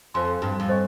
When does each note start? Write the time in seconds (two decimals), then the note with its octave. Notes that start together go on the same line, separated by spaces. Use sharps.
0.14 F2 C5 F5 G#5 C6
0.42 G2
0.60 F2
0.69 C5 D#5 G#5 C#6